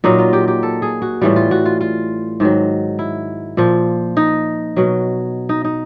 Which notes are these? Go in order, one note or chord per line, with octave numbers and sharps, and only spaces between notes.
A#2 F#3 D#4
F4
G4
G4
A4
G#4
F#4
A2 E3 G3 F4
F4
F#4
F4
F4
G#2 D#3 F#3
E4
A#2 F3
D#4
B2 F#3
D#4
D#4